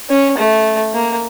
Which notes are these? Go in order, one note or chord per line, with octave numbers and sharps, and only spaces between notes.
C#4
A3
A#3